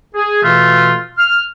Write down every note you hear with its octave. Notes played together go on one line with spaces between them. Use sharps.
G#4
B2 E3 A3 F4
F6